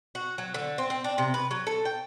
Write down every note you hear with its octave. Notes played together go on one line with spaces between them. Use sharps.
F#4
F#3
D3
C4
C4
D4
C3
B4
F#3
A4
G5